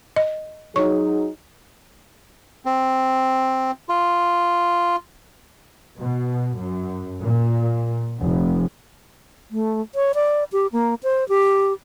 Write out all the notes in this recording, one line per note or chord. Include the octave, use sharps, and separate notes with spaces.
D#5
F#3 D#4 G#4 C#5 C#6
C4
F4
B2
F#2
A#2
F1
A3
C#5
D5
G4
A#3
C5
G4